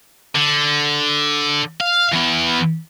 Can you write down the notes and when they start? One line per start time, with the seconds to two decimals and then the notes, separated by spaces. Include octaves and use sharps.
0.36 D3
1.81 F5
2.13 E3 B3